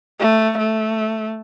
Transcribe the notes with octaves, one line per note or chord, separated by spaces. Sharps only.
A3
A3